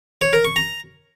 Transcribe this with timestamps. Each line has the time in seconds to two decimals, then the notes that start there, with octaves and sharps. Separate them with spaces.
0.21 C#5
0.33 A#4
0.45 C#6
0.56 A#5